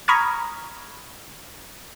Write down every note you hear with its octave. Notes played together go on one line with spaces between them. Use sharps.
A#5 B5 C#6 D#6 F6 G#6